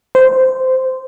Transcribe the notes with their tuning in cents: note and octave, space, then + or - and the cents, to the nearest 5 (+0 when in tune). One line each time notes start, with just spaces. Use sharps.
C5 -15